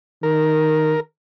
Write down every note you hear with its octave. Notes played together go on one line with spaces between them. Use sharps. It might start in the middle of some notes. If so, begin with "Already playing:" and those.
D#3 A#4